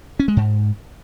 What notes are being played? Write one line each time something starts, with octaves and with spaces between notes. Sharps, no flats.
C#4
G#3
G#2